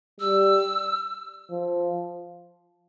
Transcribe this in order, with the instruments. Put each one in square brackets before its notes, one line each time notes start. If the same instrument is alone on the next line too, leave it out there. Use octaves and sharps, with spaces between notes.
[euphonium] G3 [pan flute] E6
[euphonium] F3